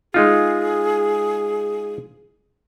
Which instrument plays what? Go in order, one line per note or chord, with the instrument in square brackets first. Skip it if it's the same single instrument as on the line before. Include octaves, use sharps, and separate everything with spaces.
[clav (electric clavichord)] G#3 D#4 F4 [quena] G#4